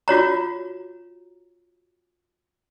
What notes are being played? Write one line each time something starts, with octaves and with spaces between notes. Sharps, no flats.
F4 F#4 C#5 A#5